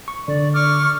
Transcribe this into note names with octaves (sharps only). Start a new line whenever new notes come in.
C#6
D3 D5
C#6 D6 F6